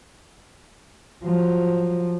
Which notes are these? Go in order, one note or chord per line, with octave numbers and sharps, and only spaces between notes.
F3 F#3